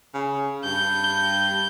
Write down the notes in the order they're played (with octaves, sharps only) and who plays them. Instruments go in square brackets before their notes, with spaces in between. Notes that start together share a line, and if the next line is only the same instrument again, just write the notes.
[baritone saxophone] C#3
[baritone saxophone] G2 [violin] G6